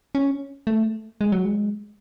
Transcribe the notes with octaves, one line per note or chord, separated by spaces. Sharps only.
C#4
A3
G#3
F#3
G#3